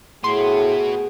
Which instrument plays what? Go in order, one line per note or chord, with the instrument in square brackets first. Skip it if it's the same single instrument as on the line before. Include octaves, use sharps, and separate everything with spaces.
[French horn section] A2 [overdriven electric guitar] B3 F#4 [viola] G#4 [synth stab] C6